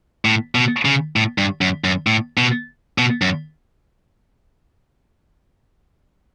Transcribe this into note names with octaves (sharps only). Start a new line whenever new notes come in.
A2
B2
C#3
A2
G2
F#2
F#2
A2
B2
B2
F#2